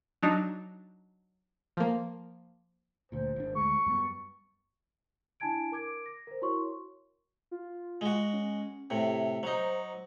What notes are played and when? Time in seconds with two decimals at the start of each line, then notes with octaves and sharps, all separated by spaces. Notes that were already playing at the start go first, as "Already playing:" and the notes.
0.23 F#3 D4 D#4
1.77 F3 A#3
3.12 D2 A#2 C5
3.36 G#1 D4
3.55 D2 G#3 C#6
3.86 F#2 G3 B3
5.40 D4 E4 G#5 A5 G#6 D7
5.72 A#4 D6 G#6 D7
6.06 A#6
6.27 A#4 C5
6.41 E4 F#4 A#4 C#5 C6 C#6
7.51 F4
8.01 G#3 F#4
8.33 C#4
8.90 A2 C3 E5
9.43 F#3 D#4 C5